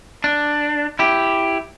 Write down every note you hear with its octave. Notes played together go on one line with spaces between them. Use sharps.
D4
E4 G4